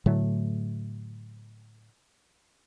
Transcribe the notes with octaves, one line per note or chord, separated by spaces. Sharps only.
A2 D3 F#3 A3